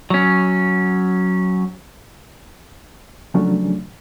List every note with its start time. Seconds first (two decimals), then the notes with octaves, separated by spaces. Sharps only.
0.10 F#3 C#4
3.34 C#3 F3 F#3 A3 C#4 D4